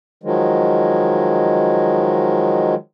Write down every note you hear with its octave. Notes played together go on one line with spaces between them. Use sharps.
D#3 F3 F#3 G#3